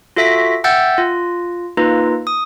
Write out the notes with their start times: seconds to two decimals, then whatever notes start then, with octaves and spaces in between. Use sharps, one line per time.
0.16 F4 F#4 A4 E5 A#6 B6
0.64 E5 F#5 G5 E6 G6 A6
0.98 F4
1.77 A#3 D#4 F4 B4
2.27 D#6